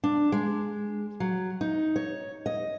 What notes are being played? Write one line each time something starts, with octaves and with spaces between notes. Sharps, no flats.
D4
G#3
F#3
D#4
C#5
D#5